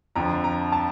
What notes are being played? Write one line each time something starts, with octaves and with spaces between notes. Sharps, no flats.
F2 D3 F3 A#5
A#5
A5